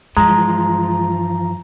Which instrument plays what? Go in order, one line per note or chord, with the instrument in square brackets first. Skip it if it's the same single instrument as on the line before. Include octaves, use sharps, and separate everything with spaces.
[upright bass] G2 [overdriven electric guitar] E3 F3 [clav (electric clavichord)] G#3 [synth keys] A#5